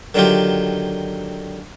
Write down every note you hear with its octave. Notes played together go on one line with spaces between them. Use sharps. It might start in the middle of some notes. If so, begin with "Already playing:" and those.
D3 D#3 F#3 F4 G4